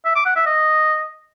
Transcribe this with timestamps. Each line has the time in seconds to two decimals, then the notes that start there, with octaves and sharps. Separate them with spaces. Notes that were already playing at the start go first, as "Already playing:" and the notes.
0.05 E5
0.16 D6
0.26 F#5
0.36 E5
0.46 D#5